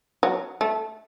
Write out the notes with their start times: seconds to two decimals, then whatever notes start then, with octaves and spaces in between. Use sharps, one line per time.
0.23 F#3
0.61 A3